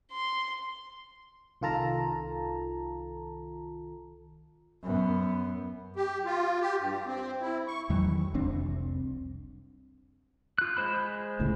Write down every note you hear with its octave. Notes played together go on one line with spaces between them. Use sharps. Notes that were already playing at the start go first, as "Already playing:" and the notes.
C6
C2 D#3 F4 A4 A5 A#5
F#2 B3
G4
F4
G4
G2
C4
E4
C#6
E2 D#3 E3 F#3
F1 C2 C4 D4
F4 F#6
G#3 C5 B5
G1 C#2 A2